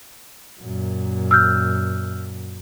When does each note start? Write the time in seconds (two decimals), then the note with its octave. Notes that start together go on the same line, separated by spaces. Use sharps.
0.60 F#2 A#2
1.31 E6 F6 G6